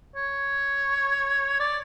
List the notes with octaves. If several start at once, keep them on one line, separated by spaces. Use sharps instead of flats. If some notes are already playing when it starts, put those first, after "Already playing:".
C#5
D5